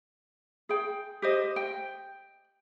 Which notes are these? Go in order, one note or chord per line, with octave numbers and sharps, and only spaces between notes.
G#4 G5
G4 C5 D#5
G5